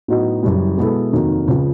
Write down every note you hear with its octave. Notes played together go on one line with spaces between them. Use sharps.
A2 F#3 B3 D#4 F#4
F#1 F#2 C#3 E3 G3
B2 G#3 B3 E4 A4
F1 D#2 D#3 F#3 A#3
C#2 C#3 F3